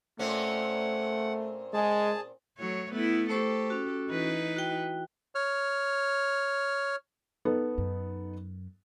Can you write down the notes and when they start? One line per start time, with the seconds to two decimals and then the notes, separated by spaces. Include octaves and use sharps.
0.19 A#2 A3 C4 C#4 F#5
1.73 G#3 G#4 A5
2.57 F#3 A3 C#5
2.91 A3 B3 E4
3.30 A3 G4 A4 C5 C#6
3.70 C#4 F#4
4.10 E3 D#4 B4
4.57 F#4 G5
5.35 C#5 F6
7.45 B3 D#4 A4
7.78 F#2